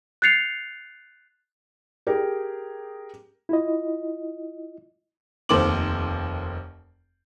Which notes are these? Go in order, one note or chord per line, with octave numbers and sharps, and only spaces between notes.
F#6 G6 A6 C7 C#7 F7
G4 G#4 A#4
E4 F4 D#5
F1 D#2 A4 C5 D6 F#7